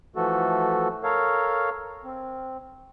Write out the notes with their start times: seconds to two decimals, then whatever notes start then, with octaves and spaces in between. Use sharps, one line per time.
0.16 E3 F3 A3 F#4 A4
1.04 A4 A#4 C#5 F5
2.04 C4